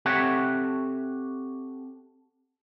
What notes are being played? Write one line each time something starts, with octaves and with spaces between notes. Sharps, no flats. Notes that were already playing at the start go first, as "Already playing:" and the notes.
C4 G4 A4 C#5 E5 F#5